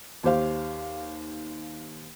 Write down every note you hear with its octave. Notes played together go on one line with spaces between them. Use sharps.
D#2 D#3 G4 C5 F5